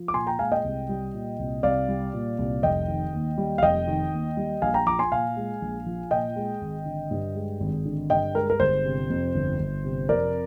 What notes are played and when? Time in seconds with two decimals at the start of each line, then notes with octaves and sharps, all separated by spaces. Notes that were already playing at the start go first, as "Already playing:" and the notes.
Already playing: F3
0.08 D6
0.14 A#2 G#5 C6
0.27 G5 A#5
0.39 G#3 F5 G#5
0.52 D#5 G5
0.64 C2
0.89 G3
1.14 A#2
1.39 C2
1.63 C2 D5 F5
1.89 G3
2.14 A#2
2.39 C2
2.63 F1 D#5 G5
2.88 D#3
3.13 D#2
3.38 G3
3.58 F5
3.62 F1 D#5 G5
3.88 D#3
4.12 D#2
4.37 G3
4.62 A#1 F5 G#5
4.74 G5 A#5
4.86 F3 A#5 D6
4.99 G#5 C6
5.12 A#2 F5 G#5
5.37 G#3
5.61 A#1
5.86 F3
6.11 A#2 D#5 G5
6.36 G#3
6.61 G#1
6.86 D3
7.11 G2
7.35 G#3
7.60 G#1
7.85 D3
8.10 G2 D#5 G5
8.35 G#3 A#4
8.50 A#4
8.60 G1 C5
8.85 C3
9.10 F2
9.34 G1
9.59 G1
9.84 C3
10.09 F2 A#4 D5